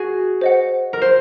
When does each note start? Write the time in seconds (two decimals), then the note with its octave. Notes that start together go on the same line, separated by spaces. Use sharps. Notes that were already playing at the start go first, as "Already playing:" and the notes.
Already playing: F#4 G#4
0.41 C5 D#5 F#5
0.93 A#4
1.02 C5